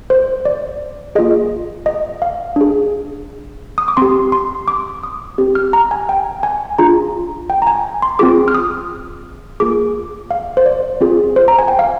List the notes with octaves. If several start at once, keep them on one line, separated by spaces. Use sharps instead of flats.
C5
D5
A#3 F4 G#4 D#5
D#5
F5
D4 G#4
D#6
D6
C4 G4 C6
C6
D6
D#6
C4 G4
F6
A#5
G#5
G5
G#5
D4 F4 G#4 A#5
G5
A#5
G#5
C6
C4 F4 G#4 D6
F6
D#6
A#3 F4 G#4 D6
F5
C5
D5
C4 F4 G#4
C5
A#5
G#5
G5
F5